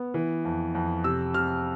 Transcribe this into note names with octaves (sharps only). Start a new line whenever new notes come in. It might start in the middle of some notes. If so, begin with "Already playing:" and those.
Already playing: B3
E3
F2
F2
C3 E6
C3 F6